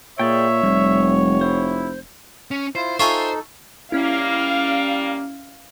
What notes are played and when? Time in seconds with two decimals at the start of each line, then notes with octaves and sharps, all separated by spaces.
0.19 A#2 G#4 C#5 D5 E5 G5
0.63 F1 G3
1.41 E4 C5
2.51 C#4
2.75 E4 F4 C5
3.00 D#4 F4 A4 C5 E5 G#5 C#6
3.92 G3 A#3 C#4 E4 F5